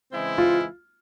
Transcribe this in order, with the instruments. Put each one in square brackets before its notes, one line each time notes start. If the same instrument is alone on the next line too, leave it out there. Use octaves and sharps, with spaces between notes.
[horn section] C#3 E3 G#3 C4 E4
[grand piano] F4